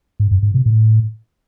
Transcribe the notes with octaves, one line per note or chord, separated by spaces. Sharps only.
G#2
F#2
G#2
C3
A2